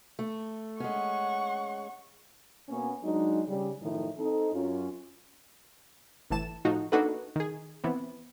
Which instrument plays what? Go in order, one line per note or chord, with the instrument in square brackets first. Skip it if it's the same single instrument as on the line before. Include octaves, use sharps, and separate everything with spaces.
[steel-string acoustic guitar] A3
[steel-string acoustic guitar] G#3 C#4 [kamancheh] F#5 C#6
[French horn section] B2 A#3 B3 C#4
F#3 G#3 D4 D#4
C#3 G3
F#2 A2 D#3 F3 D#4 E4
C4 D#4 A4
F#2 C#4 F4
[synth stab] G1 A2 E3 A5 E7
A2 F3 D#4 F#4
A#3 D4 D#4 F#4 A4 B4
D#3 G#4
E3 B3 C4